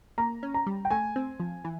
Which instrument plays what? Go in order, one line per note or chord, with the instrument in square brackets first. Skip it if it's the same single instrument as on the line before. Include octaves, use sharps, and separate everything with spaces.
[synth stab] A#3 [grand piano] A#5
[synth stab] C#4
[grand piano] A#5
[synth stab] G3
[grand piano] G5
[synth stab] A3 [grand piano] G#5
[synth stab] C4
F3
E3